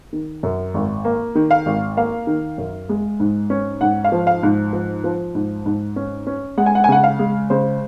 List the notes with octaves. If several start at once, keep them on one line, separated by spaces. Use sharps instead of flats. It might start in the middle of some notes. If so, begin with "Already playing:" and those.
D#3
F#2
G#1
A#3
D#3
F5
G#1
A#3 F5
D#3
F#2
G#3
G#2
C#4
G#2 F#5
F5
F3
F5
G#2
F3
F3
G#2
G#2
C#4
C#4
G#3 F#5
G#5
F#5
G#5
C#3 F#5
F5
G#3
C#3 C5